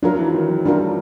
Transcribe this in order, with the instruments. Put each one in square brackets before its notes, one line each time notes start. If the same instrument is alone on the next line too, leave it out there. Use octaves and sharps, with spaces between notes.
[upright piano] F#3 [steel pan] D4 F4 A#4
[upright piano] E3
D#3
F#3
[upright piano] G3 [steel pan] D4 F4 A#4